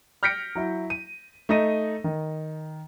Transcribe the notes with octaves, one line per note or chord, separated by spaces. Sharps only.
F6 G6 A#6 B6 C#7 D7
F#3 E4
D#7
A3 D#4 A#6 D#7
D#3